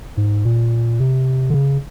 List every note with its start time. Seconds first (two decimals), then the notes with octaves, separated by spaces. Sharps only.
0.17 G#2
0.45 A#2
1.00 C3
1.50 D3
1.54 C#3